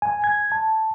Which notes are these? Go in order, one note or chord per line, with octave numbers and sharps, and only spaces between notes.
G#5
G#6
A5